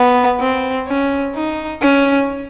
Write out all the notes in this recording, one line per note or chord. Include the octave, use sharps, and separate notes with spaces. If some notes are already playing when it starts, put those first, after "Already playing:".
Already playing: B3
C4
C#4
D#4
C#4